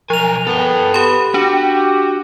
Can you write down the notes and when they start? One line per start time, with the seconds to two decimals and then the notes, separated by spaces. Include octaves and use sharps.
0.10 B1 F3 A#4 G#5 F7
0.47 B3 A4 G5
0.94 B3 G4 B5
1.34 D4 F#4 G4